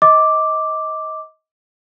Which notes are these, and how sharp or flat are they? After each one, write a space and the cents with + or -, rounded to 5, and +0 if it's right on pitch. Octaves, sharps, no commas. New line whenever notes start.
D#5 +25 D6 +0